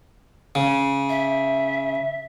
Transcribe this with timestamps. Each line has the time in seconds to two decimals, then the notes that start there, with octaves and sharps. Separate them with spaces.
0.55 C#3
1.09 E5